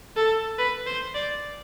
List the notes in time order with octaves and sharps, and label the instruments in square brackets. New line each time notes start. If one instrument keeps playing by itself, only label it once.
[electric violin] A4
B4
C5
D5